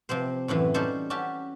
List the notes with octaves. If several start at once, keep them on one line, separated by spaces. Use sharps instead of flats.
C3 F3 C4 C5
F#2 A2 C3 E3
G3 C#4 D#4 G4 A4 C5
C#4 F#4 G4 E5 A5